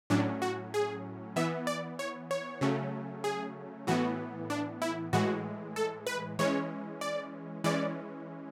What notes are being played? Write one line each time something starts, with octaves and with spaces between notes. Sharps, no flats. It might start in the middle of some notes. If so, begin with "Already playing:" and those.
A2 F#3 C#4 D4
F#4
G#4
E3 B3 E5
D5
C#5
C#5
C#3 F#3 A3 C#4
G#4
A2 E3 B3 F#4
D4
E4
A2 E3 G#3 F#4
A4
B4
E3 G#3 C#4 C#5
D5
E3 G#3 C#4 D5